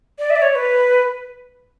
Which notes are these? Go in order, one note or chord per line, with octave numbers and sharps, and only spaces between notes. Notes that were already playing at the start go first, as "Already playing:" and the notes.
D5
E5
D5
C#5
B4